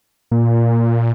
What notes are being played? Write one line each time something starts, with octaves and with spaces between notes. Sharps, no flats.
A#2